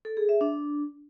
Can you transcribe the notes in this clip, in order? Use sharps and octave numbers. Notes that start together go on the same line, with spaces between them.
A4
G#4
E5
D4